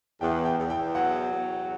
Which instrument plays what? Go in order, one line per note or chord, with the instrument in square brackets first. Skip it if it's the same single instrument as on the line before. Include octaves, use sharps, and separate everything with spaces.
[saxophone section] E2 [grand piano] G5
[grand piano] G5
[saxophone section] E2
[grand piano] G5
[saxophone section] F#3 [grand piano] F#5
[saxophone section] E2